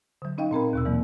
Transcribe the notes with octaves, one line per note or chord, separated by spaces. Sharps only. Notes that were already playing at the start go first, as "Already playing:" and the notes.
D3 F#3
C#4 D#4 D#5 F5 G5
A#2 C4 A#4 B5
D#2 B2 E6
E3 F#3 A#3